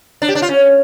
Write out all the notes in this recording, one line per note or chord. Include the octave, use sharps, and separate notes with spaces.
D4
G4
D4
F4
C#4